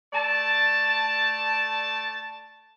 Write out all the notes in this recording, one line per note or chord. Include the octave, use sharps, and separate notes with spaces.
A3 D5 A5